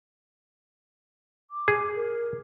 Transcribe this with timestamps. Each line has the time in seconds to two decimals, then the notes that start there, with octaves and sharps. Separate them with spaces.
1.51 D6
1.68 G#4
1.95 A#4